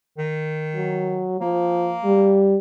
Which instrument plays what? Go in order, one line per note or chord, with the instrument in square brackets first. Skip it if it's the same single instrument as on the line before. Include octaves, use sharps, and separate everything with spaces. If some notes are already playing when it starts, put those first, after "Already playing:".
[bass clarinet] D#3
[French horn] F#3
[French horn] F3 [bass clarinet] A#3
[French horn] G3